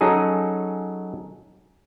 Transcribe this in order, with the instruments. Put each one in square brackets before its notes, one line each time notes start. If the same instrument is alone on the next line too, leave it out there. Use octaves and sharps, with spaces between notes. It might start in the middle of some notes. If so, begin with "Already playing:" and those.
[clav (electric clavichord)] F#3 C#4 D#4 G#4 A4